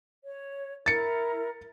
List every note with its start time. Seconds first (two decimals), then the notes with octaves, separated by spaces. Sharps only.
0.24 C#5
0.86 E4 A#4 A6 C#7